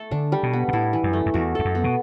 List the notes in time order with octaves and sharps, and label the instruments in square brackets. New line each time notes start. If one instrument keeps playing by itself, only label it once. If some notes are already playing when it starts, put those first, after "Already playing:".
Already playing: [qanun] A3 A4
[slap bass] D3 [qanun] D4
[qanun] G3
[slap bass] B2
[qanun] B3
[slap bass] B2
[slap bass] A2 [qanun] E4
[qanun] E3
[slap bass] F#2
[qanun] A3
[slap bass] F#2
[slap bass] E2 [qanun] F#4
[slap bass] E2 [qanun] A4
[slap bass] F#2
[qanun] B3
[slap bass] B2